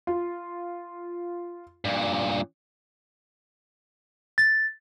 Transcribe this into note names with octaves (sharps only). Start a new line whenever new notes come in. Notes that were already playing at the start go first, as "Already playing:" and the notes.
F4
G2 A#2
A6